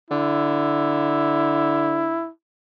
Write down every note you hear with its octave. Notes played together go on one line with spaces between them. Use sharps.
D3 E4